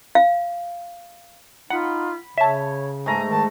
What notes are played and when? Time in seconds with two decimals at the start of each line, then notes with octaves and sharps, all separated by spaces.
0.15 F5
1.70 D#4 F4 F#5 B5
2.38 C#3 C#5 E5 A5
3.06 G#2 A3 G#5 A#5
3.29 D#3 A5